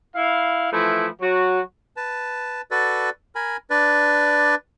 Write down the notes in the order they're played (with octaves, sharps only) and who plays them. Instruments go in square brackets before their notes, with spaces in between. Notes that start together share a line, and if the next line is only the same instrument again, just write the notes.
[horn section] E4 F5
E3 F3 A3 E4
F#3 F#4
[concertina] B4 A5
F#4 A4 B4 D5
A#4 G#5 B5
D4 B4 D5